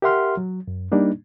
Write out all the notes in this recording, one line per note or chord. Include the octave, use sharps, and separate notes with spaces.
G4 A#4 E5 F#5 C6 F6
F#3
F#2
G3 A#3 D4 D#4